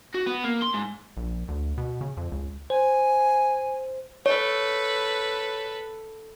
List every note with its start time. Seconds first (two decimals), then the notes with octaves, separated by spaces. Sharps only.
0.14 F#4
0.26 B3
0.44 A#3
0.62 C6
0.74 G#2
1.17 A#1
1.48 D2
1.78 B2
2.01 C#3
2.17 F2
2.32 C#2
2.70 C5 G#5
4.26 A4 B4 C#5